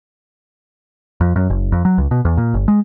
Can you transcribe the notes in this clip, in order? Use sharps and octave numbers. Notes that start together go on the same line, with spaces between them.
F2
F#2
F#1
F2
F#3
C#2
B2
E2
A#2
G1
G#3